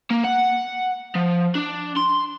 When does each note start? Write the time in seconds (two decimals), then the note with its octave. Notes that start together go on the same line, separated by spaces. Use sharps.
0.11 A#3
0.25 F#5
1.15 F3
1.55 D4
1.96 C6